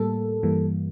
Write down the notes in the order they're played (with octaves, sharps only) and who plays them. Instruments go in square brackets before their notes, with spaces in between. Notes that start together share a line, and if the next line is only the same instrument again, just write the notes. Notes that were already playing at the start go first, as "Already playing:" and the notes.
Already playing: [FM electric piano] A2 G3 A#3 A4
G2 E3 G3 A#3